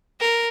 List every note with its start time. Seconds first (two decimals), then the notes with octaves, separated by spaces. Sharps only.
0.20 A#4